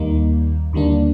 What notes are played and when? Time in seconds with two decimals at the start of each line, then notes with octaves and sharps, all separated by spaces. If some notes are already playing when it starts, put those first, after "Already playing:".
Already playing: D#2 D#3 G3 A#3 D#4
0.73 D#2 D3 G3 A#3 D4